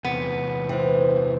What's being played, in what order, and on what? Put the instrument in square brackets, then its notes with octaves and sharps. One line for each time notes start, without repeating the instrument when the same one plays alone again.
[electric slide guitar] E2 C3 [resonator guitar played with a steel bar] B3
[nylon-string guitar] E3 [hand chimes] C5 G5